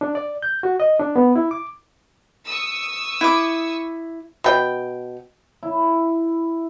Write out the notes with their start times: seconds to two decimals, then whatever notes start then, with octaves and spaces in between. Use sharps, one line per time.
0.01 D4
0.15 D5
0.43 G6
0.63 F#4
0.80 D#5
1.00 D4
1.16 B3
1.36 E4
1.51 D6
2.46 C#6 D#6 E6
3.21 E4 D6
4.44 B2 G5
5.63 E4